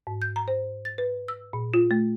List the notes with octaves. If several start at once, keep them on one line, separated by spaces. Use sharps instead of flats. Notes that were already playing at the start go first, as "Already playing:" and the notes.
G#2
G6
A#5
C5
A6
B4
E6
A#2
F4
A3